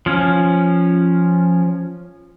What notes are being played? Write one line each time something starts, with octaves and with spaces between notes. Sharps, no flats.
F3 C#4